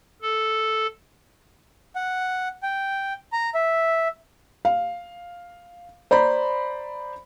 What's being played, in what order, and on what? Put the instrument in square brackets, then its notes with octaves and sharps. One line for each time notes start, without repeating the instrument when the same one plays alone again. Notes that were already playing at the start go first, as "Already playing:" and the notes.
[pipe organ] A4
[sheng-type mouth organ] F#5
G5
A#5
E5
[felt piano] F5
C5 D5 A#5 B5